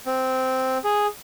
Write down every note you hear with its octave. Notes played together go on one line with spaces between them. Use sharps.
C4
G#4